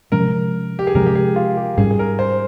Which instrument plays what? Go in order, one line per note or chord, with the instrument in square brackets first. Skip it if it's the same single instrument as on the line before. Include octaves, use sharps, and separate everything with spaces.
[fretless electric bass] C3 F3 G#3 C#4 [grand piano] A#4
[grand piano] G4
G#4
[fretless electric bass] C3 F3 G#3 C#4 [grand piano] A#4
[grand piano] G4
G#4
F4
G4
[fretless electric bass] G#2 G3 C#4 [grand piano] G#4
[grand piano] G#4
A#4
C5